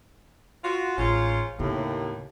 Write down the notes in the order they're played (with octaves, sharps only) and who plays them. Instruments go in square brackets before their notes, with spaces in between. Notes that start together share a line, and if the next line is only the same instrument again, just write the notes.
[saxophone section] F4 F#4
[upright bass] A1 [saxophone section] G#2 C#4 F4
[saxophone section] D#2 A2 [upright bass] C#3 B3